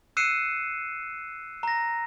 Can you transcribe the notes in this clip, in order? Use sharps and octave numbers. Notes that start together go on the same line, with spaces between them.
E6 F#6 C7 C#7 D#7 E7
A#5 A#6